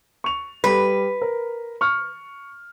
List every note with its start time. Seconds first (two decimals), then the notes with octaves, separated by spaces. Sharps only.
0.24 C#6 F7
0.64 G3 B4
1.22 A#4
1.81 C#6 F6